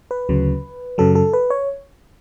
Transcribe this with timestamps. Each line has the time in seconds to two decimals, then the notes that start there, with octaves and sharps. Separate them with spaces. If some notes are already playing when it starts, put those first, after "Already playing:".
0.11 B4
0.29 D2 C#3 F#3
0.98 F#2 C#3 F#3 A4
1.15 A4
1.33 B4
1.50 C#5